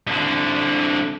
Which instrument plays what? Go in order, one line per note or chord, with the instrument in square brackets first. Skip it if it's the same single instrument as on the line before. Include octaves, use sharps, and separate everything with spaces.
[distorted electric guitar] C2 D3